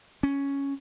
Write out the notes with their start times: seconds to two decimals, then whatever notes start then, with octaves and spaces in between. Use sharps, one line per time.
0.23 C#4